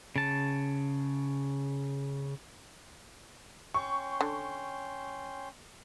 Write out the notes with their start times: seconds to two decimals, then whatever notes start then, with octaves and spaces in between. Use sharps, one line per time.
0.16 C#3 A5
3.74 C#4 G5 C6 C#6
4.21 D3